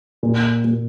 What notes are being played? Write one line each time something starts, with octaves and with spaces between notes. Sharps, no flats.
A#2
A#2